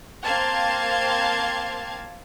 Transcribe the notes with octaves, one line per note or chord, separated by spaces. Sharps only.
A#3 C4 F5 A5 G#6